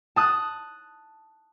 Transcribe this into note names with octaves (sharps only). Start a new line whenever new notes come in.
A5 D#6 F#6